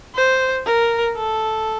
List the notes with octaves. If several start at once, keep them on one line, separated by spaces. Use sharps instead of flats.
C5
A#4
A4